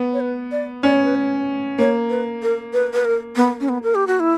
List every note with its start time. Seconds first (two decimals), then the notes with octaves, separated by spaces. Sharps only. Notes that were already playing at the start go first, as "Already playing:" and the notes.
Already playing: B3
0.13 C#5
0.20 B4
0.52 D5
0.83 C#4 D5
0.94 C#5
1.05 B4
1.15 C#5
1.78 A#3 C#5
2.10 B4
2.42 A#4
2.73 B4
2.93 B4
3.05 A#4
3.36 B3
3.61 C#4
3.69 B3
3.83 A#4
3.95 G4
4.07 F#4
4.20 E4